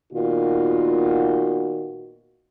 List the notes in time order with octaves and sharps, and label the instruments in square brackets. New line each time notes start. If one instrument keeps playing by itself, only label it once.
[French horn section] A#2 D#3 B3 F4 F#4